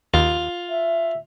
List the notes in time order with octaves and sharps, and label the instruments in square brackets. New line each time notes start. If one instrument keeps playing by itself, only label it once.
[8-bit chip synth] D#2 [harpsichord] F4
[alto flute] E5